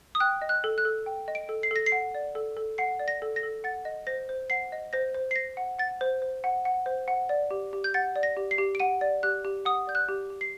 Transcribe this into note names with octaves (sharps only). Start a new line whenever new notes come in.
D#6
G5 F#6
D#5
F#6
A4
F#6
A4
G5
D#5
D7
A4
C7
A4 A#6
C7
F#5
D5
A4
A4
F#5 C7
D5
A#6
A4
A#6
A4
F#5 A6
D#5
C5 A#6
C5
F#5 C7
D#5
C5 A#6
C5
C7
C5 A#6
F#5
F#5 A6
C5
C5
F#5
F#5
C5
F#5
D5
G4
G4
G6
F#5 A6
D5
A#6
G4
C7
G4
D7
F#5 D#7
D5
G4 F#6
G4
F#5 D#6
D5 G6
F#6
G4
G4
C7